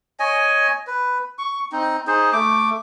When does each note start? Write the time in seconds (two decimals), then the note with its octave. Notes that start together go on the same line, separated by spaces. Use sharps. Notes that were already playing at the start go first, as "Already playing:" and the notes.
0.20 C#5 D#5 G#5
0.87 B4
1.38 C#6
1.72 C4 D#4
2.07 D#4 G#4 C5
2.33 A3 D6